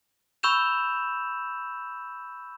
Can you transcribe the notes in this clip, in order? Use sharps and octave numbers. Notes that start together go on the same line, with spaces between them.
B5 C#6 E6 G6 E7 F7